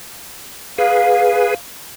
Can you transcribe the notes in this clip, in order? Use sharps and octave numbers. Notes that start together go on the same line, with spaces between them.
G#4 B4 F5